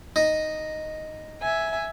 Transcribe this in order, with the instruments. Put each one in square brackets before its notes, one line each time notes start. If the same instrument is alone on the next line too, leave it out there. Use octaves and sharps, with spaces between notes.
[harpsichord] D#4
[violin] E5 G#5